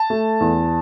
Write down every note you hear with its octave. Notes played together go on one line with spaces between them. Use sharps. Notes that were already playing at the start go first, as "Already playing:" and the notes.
Already playing: A5
A3
E2